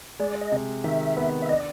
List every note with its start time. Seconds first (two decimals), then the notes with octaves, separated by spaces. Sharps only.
0.20 G#3 D5
0.41 D#5
0.52 C3
0.84 D#3 E5
1.17 B3
1.42 E5
1.49 D4 D#5